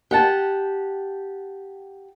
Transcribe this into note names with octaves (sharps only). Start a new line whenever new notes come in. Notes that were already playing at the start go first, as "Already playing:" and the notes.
G4 F#5 A5